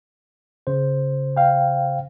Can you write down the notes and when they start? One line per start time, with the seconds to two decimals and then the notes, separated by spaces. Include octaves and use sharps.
0.67 C#3 C5
1.37 F5 G5